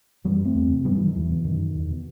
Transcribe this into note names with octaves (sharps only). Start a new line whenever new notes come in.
F#2 E3 G3
A3 C4
E2
C3
G2 G3 B3
E3 G3
D#3 F#3
E2 E3
B2
F#2 D#3
E2
B2